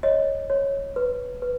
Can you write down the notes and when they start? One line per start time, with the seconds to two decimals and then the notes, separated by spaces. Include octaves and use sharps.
0.03 C#5 D#5
0.50 C#5
0.96 B4
1.42 B4